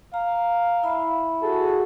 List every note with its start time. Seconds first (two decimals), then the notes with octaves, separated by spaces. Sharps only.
0.14 F5 A#5
0.83 E4 E5 B5
1.42 F#4 G#4 A4